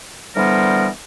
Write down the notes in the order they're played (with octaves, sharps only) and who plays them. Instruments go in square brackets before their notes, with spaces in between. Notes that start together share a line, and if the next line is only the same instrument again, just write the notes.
[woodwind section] D3 E3 G3 B3 A#4 C5